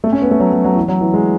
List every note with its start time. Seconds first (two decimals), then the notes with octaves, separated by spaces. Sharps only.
0.04 A3
0.12 C#4
0.22 B3
0.31 A3
0.40 F#3
0.52 F#3
0.64 F#3
0.76 E3
0.88 F#3
1.01 E3
1.14 G#3